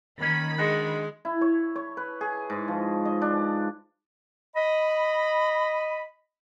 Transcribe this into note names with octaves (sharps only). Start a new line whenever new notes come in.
D#3 A#3 C#4 D#4 B5
G#3 D4 D#4 F#4
E4
C#5
C#5
B4
G#4
G#2
F3
D#5
D4
D#5 B5